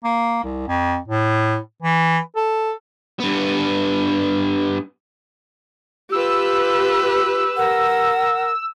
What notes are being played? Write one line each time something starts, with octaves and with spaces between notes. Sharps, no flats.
A#3
C2
F2
A2
E3
A4
G2 B3
F4 G4 B4 E6
A#4 F#5